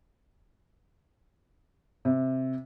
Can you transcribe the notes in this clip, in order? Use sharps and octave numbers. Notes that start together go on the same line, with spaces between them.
C3